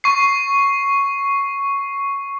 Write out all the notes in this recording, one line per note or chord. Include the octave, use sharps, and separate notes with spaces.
C#6 C7